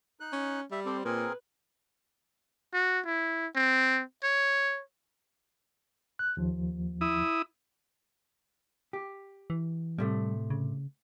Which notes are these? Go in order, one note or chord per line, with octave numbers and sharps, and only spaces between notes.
D#4 F#6
C#4
G3 E5
C4 G4 A4 C5
A#2 C4 G#4 A#4 B4
F#4
E4
C4
C#5
F#6
D#2 F3
E4 D#6
G4
E3
A2 C3 G3 A3
C#3